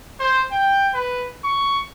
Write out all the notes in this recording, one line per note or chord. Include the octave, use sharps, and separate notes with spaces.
C5
G5
B4
C#6